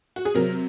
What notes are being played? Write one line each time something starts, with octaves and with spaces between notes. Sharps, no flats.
F#4
G#4
C3 F#3 C4 A#4